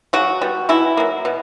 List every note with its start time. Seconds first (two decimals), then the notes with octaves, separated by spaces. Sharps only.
0.13 C#3 F#3 F#4
0.42 G3 B3
0.69 B2 E3 E4
0.97 F#3 A#3
1.25 B2